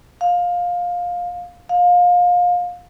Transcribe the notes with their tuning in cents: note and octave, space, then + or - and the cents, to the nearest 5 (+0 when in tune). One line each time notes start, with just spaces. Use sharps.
F5 +15
F5 +25